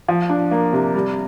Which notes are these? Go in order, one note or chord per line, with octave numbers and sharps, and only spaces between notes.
F3
D4
A#3
C3
G3